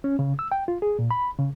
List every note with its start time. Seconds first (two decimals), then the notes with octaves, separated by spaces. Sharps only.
0.04 C#4
0.19 C#3
0.39 E6
0.52 G5
0.68 F4
0.82 G#4
0.99 A#2
1.11 B5
1.39 C#3